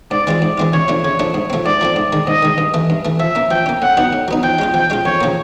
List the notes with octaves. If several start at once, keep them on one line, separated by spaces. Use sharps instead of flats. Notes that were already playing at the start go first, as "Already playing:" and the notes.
G#2 D5
E3 G#3 C4 F4
G#2
E3 G#3 C4 F4
C#3 C#5
F3 A3 D4
C#3 C#5
F3 A3 D4
G#2
F3 A3 C4
G#2 D5
F3 A3 C4
G#2
D#3 G#3
G#2 D#5
D#3 G#3
G2
E3 A3
G2
E3 A3
F3 E5
A#3 C#4
F3 G5
A#3 C#4
A2 F#5
F#3 B3 D#4
A2
F#3 B3 D#4
F3 G5
G#3 C#4 F4
F3 G5
G#3 C#4 F4
F2 C#5
C#3 F3 A#3